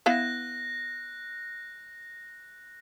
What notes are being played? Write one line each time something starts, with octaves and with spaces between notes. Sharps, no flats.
B3 E4 F5 F#6 A#6